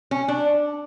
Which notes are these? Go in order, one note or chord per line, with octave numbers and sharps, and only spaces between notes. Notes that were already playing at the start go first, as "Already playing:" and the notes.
C#4
D4